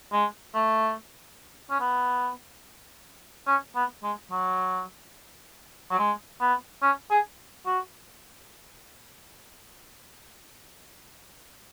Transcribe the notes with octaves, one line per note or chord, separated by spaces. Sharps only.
G#3
A3
C#4
B3
C#4
B3
G#3
F#3
F#3
G#3
B3
C#4
G#4
F#4